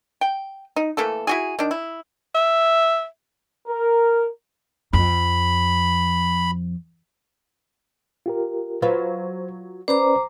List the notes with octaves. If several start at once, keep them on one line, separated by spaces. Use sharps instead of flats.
G5
D#4
E3 A3 A#3 A4
E4 F#4 G#4
D#3 D4
E4
E5
A#4
F2 B5
F4 G4 A#4
F#3 F4 B4 C5
C#4 B4 C5 D5 A#5 D6